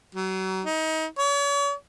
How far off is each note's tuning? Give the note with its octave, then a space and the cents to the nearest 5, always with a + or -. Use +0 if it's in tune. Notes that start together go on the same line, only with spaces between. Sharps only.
F#3 +35
D#4 +30
C#5 +40